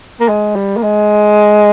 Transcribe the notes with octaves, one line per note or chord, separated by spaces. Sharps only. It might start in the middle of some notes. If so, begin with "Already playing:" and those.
A#3
G#3
G3
A#3
G#3